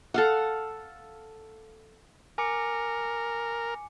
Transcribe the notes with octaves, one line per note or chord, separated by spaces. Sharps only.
A4 F5 F#5
A#4 G#5 D6 C#7